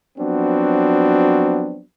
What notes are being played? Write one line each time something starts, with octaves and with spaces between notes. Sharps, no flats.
F3 F#3 B3 C4 D4 F#4